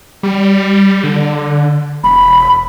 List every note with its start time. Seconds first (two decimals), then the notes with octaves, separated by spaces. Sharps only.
0.23 G3
1.04 D3
2.04 E1 B5